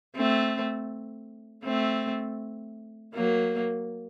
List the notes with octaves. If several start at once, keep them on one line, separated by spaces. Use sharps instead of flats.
A3 C4
A3 C4
F#3 A#3